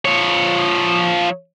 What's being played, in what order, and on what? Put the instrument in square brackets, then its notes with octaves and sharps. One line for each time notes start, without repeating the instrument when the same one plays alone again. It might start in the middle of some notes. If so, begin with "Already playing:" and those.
[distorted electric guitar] F3 C#5